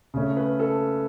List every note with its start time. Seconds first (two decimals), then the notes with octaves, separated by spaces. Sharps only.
0.14 C#3 A3 C#4
0.37 B4
0.59 A4